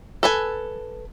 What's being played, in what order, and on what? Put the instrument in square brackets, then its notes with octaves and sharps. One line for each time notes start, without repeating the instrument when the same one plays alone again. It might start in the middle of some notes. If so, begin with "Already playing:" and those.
[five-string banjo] A4 B4 G#5